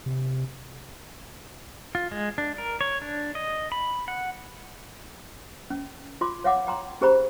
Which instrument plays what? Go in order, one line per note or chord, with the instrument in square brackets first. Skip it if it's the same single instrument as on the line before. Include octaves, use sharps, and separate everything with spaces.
[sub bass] C3
[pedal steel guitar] F4
G#3
D4
A#4
C#5
D4
D#5
B5
F#5
[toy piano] C#4
F4 C6 D6
C#5 F5 F#5 D6
G5 A#5 C6
C#4 G4 G#4 C5 A#5 B5